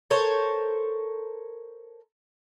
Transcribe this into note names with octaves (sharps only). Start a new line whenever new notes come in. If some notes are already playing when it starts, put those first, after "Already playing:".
A4 A#4 C5 C#5